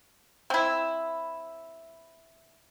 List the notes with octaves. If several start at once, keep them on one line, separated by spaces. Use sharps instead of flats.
C4 E4